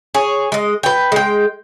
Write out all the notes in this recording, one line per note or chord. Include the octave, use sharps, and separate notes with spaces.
G#4 C#5
G#3 D#5
B4 G5
G#3 G5